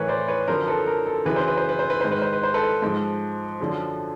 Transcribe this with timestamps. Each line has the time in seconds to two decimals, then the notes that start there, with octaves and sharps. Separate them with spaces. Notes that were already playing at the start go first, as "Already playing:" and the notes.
Already playing: A2 E3 A#4 B4 C#5
0.08 C5 D5
0.28 B4 C#5
0.47 F#2 D3 F3 A#4 C5
0.67 A4 B4
0.87 A#4
1.07 A4
1.25 F#2 C#3 E3 B4
1.36 C5
1.47 B4
1.57 C5
1.69 B4
1.79 C5
1.90 B4
2.01 G#2 D#3 C5
2.12 B4
2.22 C5
2.33 B4
2.43 C5
2.54 A4 B4
2.82 G#2 F3
3.60 F#2 D3 F3